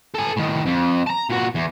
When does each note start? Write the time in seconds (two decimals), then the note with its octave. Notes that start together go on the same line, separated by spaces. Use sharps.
0.14 A4 G#5
0.37 A2 D#3
0.66 F2
1.07 A5 A#5
1.30 A#2 F#4
1.55 E2